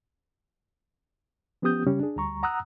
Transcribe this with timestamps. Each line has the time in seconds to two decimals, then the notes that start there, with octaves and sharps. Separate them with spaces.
1.62 F3 B3 C#4 G4 D#6 G6
1.86 C#3 G3 C#4 G4
1.99 D4 G#4
2.16 D2 G3 A#5 C#6
2.43 F#5 A#5 D#6 E6 F#6